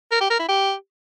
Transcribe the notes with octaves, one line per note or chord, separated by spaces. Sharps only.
A#4
G4
A#4
E4
G4